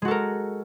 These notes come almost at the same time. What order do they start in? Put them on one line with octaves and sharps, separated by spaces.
G#3 F#4 A4 A#4